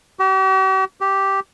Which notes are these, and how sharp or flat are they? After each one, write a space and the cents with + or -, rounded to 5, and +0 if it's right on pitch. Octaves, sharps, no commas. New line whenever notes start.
G4 -45
G4 -5